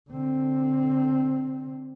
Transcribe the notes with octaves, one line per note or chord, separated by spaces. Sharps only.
D3 C4